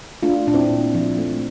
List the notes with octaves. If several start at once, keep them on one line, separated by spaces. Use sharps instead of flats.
A3 D4 F4
A#2 D4
C4 E4
A#2
F3
A3